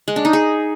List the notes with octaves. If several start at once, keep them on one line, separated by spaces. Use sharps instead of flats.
G#3
D4
D#4
G#4